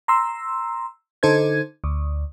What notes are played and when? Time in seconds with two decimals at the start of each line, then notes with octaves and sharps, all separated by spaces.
0.08 A#5 C6 E6
1.23 D3 D#4 A4 C5 G#6
1.84 D2